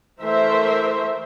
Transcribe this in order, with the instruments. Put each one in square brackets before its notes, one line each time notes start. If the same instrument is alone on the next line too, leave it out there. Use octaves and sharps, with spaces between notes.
[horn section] E3 A3 [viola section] A#4 C5 E5